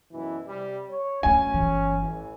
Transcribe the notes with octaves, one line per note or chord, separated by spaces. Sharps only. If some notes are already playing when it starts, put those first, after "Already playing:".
F#2 B2 E3
C3 G3
C#5
D#3 F#3 A3 C#4 G#5
G1 E3
A1 E3